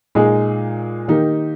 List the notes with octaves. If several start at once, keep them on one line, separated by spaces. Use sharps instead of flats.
A#2 G#3 D#4 G#4
D#3 A#3 D#4 G4